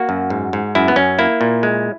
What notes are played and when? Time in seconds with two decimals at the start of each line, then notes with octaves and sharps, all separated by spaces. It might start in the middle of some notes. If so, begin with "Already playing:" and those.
Already playing: A#3 F#4
0.09 F#2
0.30 G#2
0.53 G#2
0.75 F#2 E4
0.88 B3
0.96 F#2 C#4
1.19 A#3 E4
1.41 A#2
1.63 G#3